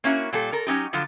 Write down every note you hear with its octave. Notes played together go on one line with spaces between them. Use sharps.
A#3 C#4 E4 F#4
A#2 G3 A4
A4 A#4
F#3 C#4 D#4 G4
D3 F3 F#3 F4